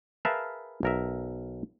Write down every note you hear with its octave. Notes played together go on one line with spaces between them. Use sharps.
G#4 A#4 B4 E5 F5 A5
B1 A#4 E5